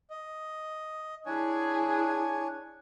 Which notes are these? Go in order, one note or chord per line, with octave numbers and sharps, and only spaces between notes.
D#5
D4 E4 G#4 C#5 G#5